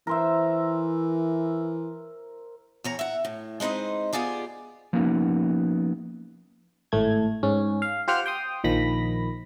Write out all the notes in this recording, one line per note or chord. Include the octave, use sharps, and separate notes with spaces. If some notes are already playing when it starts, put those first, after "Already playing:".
E3 A#4 C5 E5
E2 C#5 A#5
E5 F#5
A2
G#3 C4 D#4 B4 C5
B3 F4 G4 G#4 D5
F3 A#3 B3 C#4 D#4 F#4
G#1 A2 A3 G#6
G#2 C#4
F5
F4 G4 C5 F#5 G5 F6
G5 C6 D#6
A#1 D#3 F3 B5 A#6